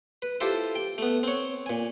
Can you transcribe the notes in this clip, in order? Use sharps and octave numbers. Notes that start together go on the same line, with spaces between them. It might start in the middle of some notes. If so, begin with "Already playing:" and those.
B4
E4 F4 G4 A4 C5
G5
A3 B3
C4 C#5
A#2 G#5